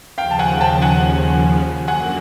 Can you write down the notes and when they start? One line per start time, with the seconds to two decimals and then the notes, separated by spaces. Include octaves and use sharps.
0.18 D#2 C#3 F3 F5 G5
0.31 A5
0.39 F#5 G#5
0.61 G5 A5
0.82 F#5 G#5
1.88 F#2 D3 F#3 A#3 F#5 G#5